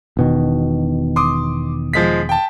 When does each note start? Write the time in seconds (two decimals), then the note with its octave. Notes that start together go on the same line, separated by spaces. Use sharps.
0.17 E1 B2 D#3
1.16 C6 D6 D#6
1.93 F3 G#3 B6
2.29 G5 A5